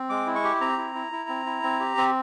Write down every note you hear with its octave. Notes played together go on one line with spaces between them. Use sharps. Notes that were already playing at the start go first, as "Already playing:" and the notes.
Already playing: C4
G#3 D6
E4
C#6
G4
C4 A#5
E4
E4
E4
C4
E4
C4
G4
C4